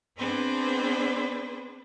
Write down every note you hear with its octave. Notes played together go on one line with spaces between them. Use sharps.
B3 C4 D4 G#4 B4 C5